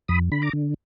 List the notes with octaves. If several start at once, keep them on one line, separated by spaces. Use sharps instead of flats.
F2 B5 D#6
D3 B5
A#5 D6
D3